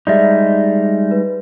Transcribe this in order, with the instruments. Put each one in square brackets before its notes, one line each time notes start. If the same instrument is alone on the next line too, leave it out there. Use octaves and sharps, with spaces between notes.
[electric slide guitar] G3 G#3 D#4 [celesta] D5 E5
[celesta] B4